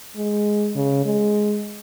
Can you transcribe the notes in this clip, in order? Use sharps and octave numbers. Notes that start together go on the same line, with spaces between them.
G#3
C#3
G#3